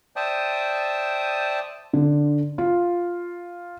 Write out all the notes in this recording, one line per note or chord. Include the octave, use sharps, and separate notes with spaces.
C5 D5 E5 G5 A5 D#6
D3
F4